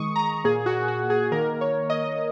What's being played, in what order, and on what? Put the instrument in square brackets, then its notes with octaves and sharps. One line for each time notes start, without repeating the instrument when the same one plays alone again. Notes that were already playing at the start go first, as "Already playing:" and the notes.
Already playing: [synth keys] D#3 G#3 C#6 D#6
A#5
A#2 A#3 G#4
F#4
F#4
G#4
D#3 A#3 A#4
C#5
D#5